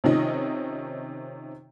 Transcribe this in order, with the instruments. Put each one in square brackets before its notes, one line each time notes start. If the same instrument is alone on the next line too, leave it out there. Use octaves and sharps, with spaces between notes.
[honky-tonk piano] C3 D#3 F3 C#4 D#4 D#5